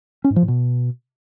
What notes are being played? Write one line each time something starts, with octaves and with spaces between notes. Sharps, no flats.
C#4
G#2
F3
A2
B2